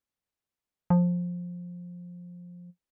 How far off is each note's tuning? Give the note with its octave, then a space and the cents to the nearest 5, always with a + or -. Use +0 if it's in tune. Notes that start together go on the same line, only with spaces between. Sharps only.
F3 +15